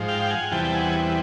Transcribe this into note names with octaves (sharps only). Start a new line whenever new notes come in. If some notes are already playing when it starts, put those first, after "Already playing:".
Already playing: G#2 F3
F5 G5
F#5 G#5
E2 C3 E3 G3 G5 A5
G5
F#5 G#5